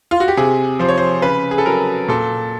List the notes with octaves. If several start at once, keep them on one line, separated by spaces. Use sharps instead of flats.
F4
F#4
G4
C3 G#4
F3 C5
C#5
C5
C#3 B4
G#4
A4
F#3 A#4
A#2 A4